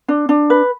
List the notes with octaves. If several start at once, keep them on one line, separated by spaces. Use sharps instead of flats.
D4
D4
B4